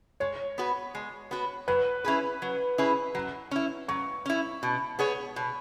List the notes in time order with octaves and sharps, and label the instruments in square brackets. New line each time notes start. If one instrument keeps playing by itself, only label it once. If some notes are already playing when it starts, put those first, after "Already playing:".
[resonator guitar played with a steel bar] G#3 [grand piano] C#5
[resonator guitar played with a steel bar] B3 F#4 B4
G#3
B3 F#4 B4
[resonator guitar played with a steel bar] F#3 [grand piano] B4
[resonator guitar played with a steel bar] C#4 E4 G#4 B4
F#3
C#4 E4 G#4 B4
F#3
C#4 E4
[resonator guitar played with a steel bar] F#3 [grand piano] C#6
[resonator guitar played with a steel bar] C#4 E4
B2
B3 G#4 C#5
B2